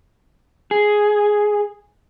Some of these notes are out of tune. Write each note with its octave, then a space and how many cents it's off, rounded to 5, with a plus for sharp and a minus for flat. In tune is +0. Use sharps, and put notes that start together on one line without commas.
G#4 +5